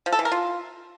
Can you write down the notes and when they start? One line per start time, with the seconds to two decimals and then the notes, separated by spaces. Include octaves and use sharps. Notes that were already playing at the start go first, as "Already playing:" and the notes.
0.06 F3
0.12 A4
0.19 E3
0.25 A#4
0.32 F4